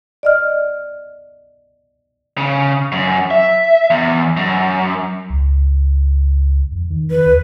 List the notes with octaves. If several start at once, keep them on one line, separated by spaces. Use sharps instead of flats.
D5 D#5 F6
C#3
F#2
E5
E2
F#2
C#2
F2
D#3
D#3 B4
D#2